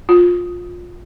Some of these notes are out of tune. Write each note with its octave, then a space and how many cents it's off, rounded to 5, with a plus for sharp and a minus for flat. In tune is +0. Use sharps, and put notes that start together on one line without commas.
F4 +20